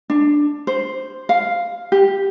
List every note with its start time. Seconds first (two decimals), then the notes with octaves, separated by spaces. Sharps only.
0.10 D4
0.67 C5
1.29 F5
1.92 G4